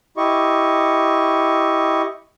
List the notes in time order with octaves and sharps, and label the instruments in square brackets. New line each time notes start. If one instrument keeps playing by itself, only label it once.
[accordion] E4 G4 D#5 C#6